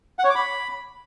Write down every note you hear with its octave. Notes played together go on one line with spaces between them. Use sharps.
F#5
C#5
D6
B5